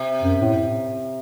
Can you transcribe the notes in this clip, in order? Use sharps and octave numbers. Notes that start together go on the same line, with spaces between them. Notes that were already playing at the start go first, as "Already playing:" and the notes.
Already playing: C3
F#2
A2